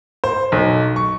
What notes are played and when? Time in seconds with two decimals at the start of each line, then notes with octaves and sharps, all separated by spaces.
0.24 C5
0.52 B1
0.96 C#6